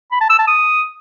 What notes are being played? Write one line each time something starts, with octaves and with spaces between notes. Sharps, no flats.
B5
A5
E6
A5
D#6